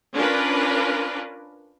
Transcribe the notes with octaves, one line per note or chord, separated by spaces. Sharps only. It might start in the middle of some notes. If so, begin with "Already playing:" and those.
C#4 D4 F4 A#4 B4